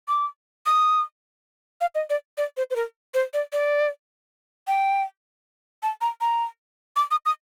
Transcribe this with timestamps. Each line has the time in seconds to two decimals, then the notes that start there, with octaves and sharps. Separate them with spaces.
0.08 D6
0.66 D#6
1.81 F5
1.95 D#5
2.10 D5
2.38 D5
2.57 C5
2.70 C5
2.76 A#4
3.14 C5
3.34 D5
3.53 D5
4.68 G5
5.83 A5
6.01 A#5
6.21 A#5
6.96 D6
7.11 D#6
7.26 D#6